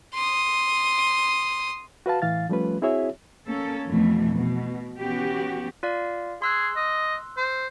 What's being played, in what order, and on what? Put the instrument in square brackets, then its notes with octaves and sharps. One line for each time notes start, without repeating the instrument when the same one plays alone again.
[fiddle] C6 D#6
[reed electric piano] F#4 B4 F5 A5
A2 E3 F5 A6
F3 G3 A3 C#4 F4 B4
C4 E4 F#4 G#4 C#5 E5
[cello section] A#3 C#4 A4
F2 B2 E3 A3
B2
E3 B3 C#4 F#4 G4
[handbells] F4 D5 F5
[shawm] G#4 [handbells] C6 E6 F#6
[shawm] D#5
C5